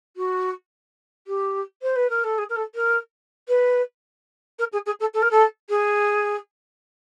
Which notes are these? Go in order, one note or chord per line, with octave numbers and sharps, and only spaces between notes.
F#4
G4
C5
B4
A#4
A4
G#4
A#4
A4
A#4
B4
A#4
G#4
G#4
A4
A4
A#4
A4
G#4